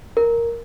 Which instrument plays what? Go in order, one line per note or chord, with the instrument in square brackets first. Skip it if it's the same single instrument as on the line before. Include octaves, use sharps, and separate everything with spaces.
[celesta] A#4